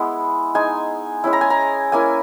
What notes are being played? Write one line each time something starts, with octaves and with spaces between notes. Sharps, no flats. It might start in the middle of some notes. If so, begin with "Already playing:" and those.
Already playing: G#3 B3 E4
G#3 D#4 G#5
G#3 C#4 E4
A#5
G#5
A#5
A#3 C#4 E4 G#5